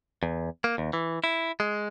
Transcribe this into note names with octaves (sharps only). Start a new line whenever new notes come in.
E2
A#3
D#2
E3
E4
G#3